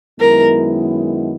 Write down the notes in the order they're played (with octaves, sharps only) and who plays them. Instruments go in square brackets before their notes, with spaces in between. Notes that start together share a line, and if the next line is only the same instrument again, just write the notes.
[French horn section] F#2 D#3 G#3 B3 E4 [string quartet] A#4